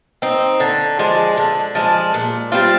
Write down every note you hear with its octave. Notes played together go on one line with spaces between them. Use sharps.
C4 D#4
D3
F3 G#3 D4
D3
F3 G#3 D4
A#2
G3 C4 F4